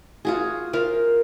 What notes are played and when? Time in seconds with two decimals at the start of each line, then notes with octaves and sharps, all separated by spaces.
0.25 F4 F#4 G#4
0.73 F4 A#4 C5